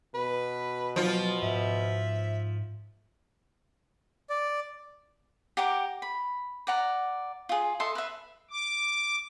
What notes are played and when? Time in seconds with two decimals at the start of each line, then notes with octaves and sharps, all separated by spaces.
0.15 B2 B4
0.96 F3 F#3 F4
1.42 G#2 E5
4.30 D5
5.57 G4 F#5 A#5 D6
6.02 B5
6.67 D5 F#5 A#5
7.49 F4 G#4
7.80 A4 D#5 E5 C6
7.95 B4 E5
8.50 D6